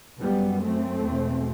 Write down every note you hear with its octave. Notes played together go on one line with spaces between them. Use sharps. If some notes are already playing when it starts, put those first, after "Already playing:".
F#2 G3 B3
A3 C4
E2 B2